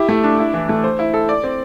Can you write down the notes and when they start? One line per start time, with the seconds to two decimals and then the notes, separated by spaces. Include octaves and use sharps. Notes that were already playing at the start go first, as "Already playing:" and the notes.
Already playing: E4 G4
0.09 A3
0.24 D4
0.39 E4
0.54 E3
0.69 A3
0.84 C5
0.99 E4
1.14 A4
1.29 D5
1.44 C4